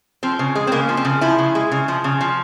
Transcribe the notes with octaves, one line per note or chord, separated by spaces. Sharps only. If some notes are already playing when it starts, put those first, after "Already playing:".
F3 C4
C#3
G#3
C4
C#3 A#3
F3
C4
C#3
F3 E4
C#3
G#3
C#3
F3
C#3
F3